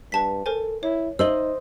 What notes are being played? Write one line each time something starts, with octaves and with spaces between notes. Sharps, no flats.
G2 B4 A5 B6
A4 A#4 C5 G#5
E4 C#5
D#4 C5 D#5 E6 F#7 G7